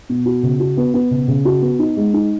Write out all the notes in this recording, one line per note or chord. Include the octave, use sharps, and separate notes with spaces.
B2
F#4
C#3
F#4
B3
B3
C#3
C#3
F#4
B3
D#4
G#3
D#4